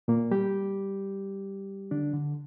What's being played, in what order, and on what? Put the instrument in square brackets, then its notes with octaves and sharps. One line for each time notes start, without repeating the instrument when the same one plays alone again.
[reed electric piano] A#2 A#3
G3 G4
D3 D4
D3